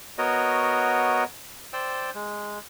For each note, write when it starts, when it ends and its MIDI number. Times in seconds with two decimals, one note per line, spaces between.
0.18 1.24 59
0.18 1.24 66
0.18 1.24 70
0.18 1.24 73
0.18 1.24 75
1.73 2.10 72
1.73 2.10 74
1.73 2.10 79
1.73 2.10 88
2.15 2.59 56